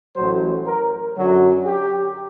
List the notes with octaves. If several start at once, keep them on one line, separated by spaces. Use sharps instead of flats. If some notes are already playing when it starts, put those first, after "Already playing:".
A1 A2 F#3 C5
A#4
F#2 D3 F#3
G4